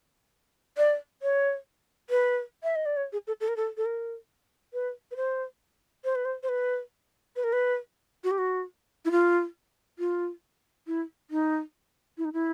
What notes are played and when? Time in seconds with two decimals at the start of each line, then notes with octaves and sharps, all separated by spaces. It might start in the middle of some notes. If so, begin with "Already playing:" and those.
0.78 D5
1.22 C#5
2.10 B4
2.63 E5
2.76 D#5
2.86 D5
2.97 C#5
3.13 G#4
3.27 A4
3.41 A4
3.48 A#4
3.57 A4
3.77 A4
3.86 A#4
4.73 B4
5.11 B4
5.16 C5
6.04 C5
6.15 B4
6.25 C5
6.43 C5
6.49 B4
7.36 B4
7.44 A#4
7.53 B4
8.24 F#4
8.31 G4
8.38 F#4
9.05 E4
9.11 F4
9.99 F4
10.87 E4
11.31 D#4
12.18 E4
12.25 D#4
12.33 E4